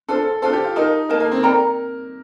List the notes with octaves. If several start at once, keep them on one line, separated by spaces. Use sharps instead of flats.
D4 F4 A4 C5
A4
D4 F4 A4 C5
G4
F4
D#4 A#4 D#5 A5
A#3 A#4 D#5 A5
A#3
C4
A4 A#4 D5 G5 A#5